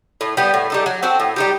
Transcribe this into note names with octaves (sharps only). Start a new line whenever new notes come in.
A2
G3 B3
A2
G3 D#4 A4
F#3
C4 F#4 A4
A2
G3 D#4 G4